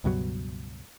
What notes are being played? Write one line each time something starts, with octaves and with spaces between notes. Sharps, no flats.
C#2 G2 B2 F#3